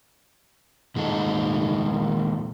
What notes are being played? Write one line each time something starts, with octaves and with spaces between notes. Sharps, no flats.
A#2 D#3 G#3 D#4 A4